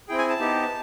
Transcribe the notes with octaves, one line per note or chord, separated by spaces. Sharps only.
C4 E4 G#4 G5
G#5
A5
B3 D#4 G4